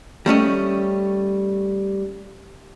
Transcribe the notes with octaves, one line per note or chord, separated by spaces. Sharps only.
G3 A3 C#4 D#5